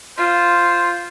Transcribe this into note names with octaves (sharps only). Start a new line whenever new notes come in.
F4 C5